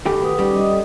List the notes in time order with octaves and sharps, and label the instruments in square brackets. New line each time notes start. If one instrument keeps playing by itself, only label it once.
[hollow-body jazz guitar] D#3 A3 G4 [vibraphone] B5
[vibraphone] B4 F#5 D#6
[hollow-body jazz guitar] G3 [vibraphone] C#4 D#4 D6
[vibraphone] D#5 D#6
A4